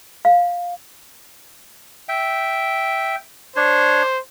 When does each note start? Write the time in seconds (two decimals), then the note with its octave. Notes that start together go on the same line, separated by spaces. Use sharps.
0.25 F5
2.09 E5 G5
3.56 D4 C5 C#5